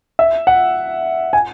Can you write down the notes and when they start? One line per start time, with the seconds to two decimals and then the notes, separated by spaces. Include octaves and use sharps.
0.19 E5
0.47 F#5
1.33 G#5